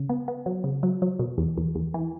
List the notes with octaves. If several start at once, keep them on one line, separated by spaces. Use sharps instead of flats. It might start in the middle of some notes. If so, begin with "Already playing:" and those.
Already playing: C#3
B3
B3
F#3
C#3
F#3
F#3
B2
E2
E2
E2
E3